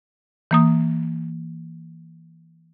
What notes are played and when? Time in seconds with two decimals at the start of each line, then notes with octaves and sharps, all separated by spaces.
0.51 E3 A#3 D#6